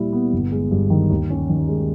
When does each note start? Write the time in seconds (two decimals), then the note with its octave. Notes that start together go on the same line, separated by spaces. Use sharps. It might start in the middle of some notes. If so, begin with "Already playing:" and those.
Already playing: A#2 G3 E4
0.13 B3
0.33 G1
0.52 G#3
0.71 G2
0.90 D#3
1.10 D#2
1.30 C#4
1.49 D#3
1.69 G#3